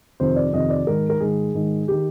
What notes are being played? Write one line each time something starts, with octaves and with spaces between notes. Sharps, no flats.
F2 C3 D#3 C5
D5
F2 C3 D#3 D#5
D5
G#2 D#3 A#4
A#4
G#2 D#3 G#4
G#2 D#3
D#3 G4